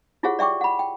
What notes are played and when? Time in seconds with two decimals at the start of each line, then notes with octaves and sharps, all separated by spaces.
0.23 E4 F4 G4 G#4 C#5 F#5
0.39 D5 E5 G5 C#6 D6
0.61 F#5 B5
0.79 G5